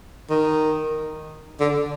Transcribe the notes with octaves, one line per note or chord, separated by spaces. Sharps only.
D#3
D3